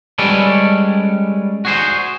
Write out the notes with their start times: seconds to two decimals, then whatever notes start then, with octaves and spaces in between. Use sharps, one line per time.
0.18 G3 G#3 C#4 A4 B4 D5
1.65 F#4 G#4 C5